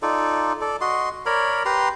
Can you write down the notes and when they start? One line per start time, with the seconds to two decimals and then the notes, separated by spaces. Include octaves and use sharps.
0.02 D#4 F4 A4 D5
0.61 A4 D5
0.81 F#4 D#5 C6
1.26 A#4 C#5 D5 B5
1.65 G4 B4 A#5 C6